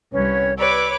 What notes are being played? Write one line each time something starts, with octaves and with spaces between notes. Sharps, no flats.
C2 C#4 B4 C#5
G4 B4 C#5 D5 D6 E6